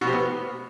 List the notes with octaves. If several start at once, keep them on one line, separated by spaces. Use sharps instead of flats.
B2
C3
B3